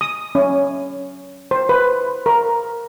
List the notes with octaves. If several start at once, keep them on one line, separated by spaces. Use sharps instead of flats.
D#6
C#4
C5
B4
A#4